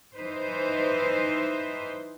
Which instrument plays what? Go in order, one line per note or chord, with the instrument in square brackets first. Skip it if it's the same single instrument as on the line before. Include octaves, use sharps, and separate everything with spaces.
[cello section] E3 D#4 B4 C5